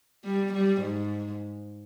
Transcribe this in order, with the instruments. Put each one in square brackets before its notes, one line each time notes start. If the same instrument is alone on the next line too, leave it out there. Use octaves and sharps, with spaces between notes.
[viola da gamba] G3
G3
G#2